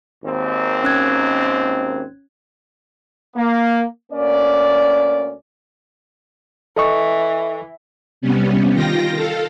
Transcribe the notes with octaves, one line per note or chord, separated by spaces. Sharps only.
G#1 D#2 C4
C#4 F#6 G#6
A#3
D2 A#3 C#4 D5
E3 A4 D#5 C#6
C3 G3 B3 C#4
D#3 F4 G5 A#6
A4 F5